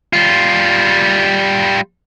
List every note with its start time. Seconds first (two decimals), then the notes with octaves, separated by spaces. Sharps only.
0.13 G3 F4